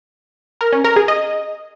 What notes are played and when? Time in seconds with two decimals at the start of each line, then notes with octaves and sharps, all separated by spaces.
0.61 A#4
0.73 C#4
0.84 A#4
0.96 G#4
1.08 D#5